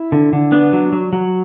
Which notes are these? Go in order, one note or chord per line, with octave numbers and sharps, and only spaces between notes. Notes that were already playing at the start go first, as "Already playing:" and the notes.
Already playing: E4
D3
D3
B3 D4
F#3
F#3
F#3